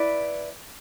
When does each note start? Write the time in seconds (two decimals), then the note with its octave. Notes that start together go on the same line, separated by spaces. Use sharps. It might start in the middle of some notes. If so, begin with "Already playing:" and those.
Already playing: E4 B4 D5